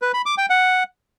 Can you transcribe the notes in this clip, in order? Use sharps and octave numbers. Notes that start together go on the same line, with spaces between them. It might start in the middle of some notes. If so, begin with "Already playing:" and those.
B4
B5
D6
G5
F#5